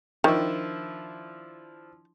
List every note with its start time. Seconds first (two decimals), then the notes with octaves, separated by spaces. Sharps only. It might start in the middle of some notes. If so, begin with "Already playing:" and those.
0.24 D#3 F3 D4 E4